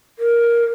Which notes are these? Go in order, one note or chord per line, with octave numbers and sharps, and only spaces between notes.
A#4